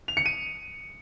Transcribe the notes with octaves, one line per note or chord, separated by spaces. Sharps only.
F7
C#7
D#7